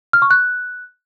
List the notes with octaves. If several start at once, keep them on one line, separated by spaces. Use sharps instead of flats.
F6
C#6
F#6